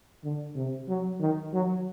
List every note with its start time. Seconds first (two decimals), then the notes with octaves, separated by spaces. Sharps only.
0.24 D3
0.55 C3
0.88 F#3
1.20 D#3
1.53 F#3